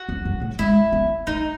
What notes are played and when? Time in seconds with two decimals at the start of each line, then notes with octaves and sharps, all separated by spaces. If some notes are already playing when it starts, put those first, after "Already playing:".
Already playing: F#4
0.09 E2
0.25 F#2
0.42 A2
0.59 G#3 E4
0.92 B3
1.27 A3 D#4